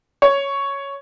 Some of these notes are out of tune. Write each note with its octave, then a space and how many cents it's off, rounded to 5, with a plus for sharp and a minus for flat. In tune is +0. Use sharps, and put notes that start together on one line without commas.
C#5 +5